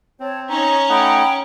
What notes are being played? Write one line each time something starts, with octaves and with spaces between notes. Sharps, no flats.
C4 C#5 A5
C#4 D#4 C#5 A#5
A3 D#4 F#5 G5 B5